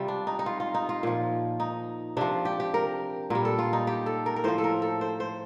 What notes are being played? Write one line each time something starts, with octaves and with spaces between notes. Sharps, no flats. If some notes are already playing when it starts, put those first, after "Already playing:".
Already playing: C3 G3 F4 G4
D4
D#4
D#4
F4
F4
D#4
F4
A#2 F3
D#4
C3 F3 D4
G4
G4
A#4
A#2 G3 A#4
A4
F4
D#4
G4
A4
A#4
A#4
A2 F3 C5
A4
A#4
A4
C5
C5